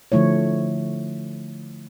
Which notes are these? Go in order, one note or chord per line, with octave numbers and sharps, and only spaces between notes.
D3 F3 A3 E4 C#5